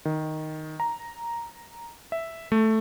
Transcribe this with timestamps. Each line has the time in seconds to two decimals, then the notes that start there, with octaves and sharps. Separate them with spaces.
0.05 D#3
0.80 A#5
2.12 E5
2.52 A3